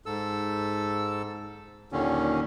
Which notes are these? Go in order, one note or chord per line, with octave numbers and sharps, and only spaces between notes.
G#2 A4 E6
D#2 A#2 D3 D#3 C#4